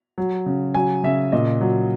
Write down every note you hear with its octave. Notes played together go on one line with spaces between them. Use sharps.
F#3
C#3
F#3 G#5
C#3 E5
A#2 D#5
F#3